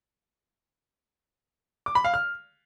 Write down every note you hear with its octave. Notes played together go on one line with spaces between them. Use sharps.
D6
B5
F5
F6